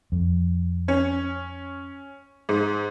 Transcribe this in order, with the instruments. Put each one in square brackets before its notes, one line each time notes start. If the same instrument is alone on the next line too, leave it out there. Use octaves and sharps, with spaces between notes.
[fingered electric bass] F2
[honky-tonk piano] C#4
G#2